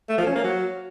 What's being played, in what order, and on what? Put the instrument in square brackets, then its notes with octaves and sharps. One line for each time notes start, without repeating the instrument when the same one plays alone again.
[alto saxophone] A3
F3
C#4
A#3
F#3